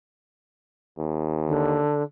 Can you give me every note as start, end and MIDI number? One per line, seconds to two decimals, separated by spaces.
0.98 1.82 39
1.48 2.03 50